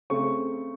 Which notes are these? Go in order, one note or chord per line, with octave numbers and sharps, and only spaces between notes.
C#3 A3 C4 C#6